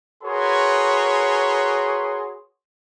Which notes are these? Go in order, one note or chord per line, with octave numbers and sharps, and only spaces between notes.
F#4 G#4 A#4 B4 C#5 C6